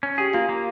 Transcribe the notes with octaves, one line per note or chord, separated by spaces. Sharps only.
C#4
G4 G#4
A#3 F4
A#3